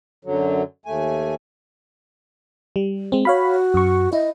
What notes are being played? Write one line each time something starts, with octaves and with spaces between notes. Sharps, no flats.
F#2 D3 F#3
D#2 A3 G#5
G3
G#3 C4
F#4 C#5 F5 B5
F#2 C#6
E4 D#5